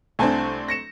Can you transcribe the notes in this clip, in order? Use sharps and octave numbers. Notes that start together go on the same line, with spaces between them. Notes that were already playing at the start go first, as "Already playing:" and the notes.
C2 A3 C4 D4 G#5 A5
A#6 C#7 E7